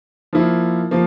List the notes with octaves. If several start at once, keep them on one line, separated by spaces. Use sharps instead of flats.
F3 A#3 E4
F3 A#3